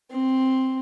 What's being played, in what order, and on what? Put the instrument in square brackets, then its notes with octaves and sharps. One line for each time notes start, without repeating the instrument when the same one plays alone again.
[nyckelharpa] C4